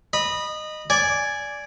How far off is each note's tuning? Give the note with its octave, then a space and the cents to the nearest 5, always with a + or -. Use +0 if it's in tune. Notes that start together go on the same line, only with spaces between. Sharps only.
D#5 -20 B5 -15
D5 -10 G#5 +0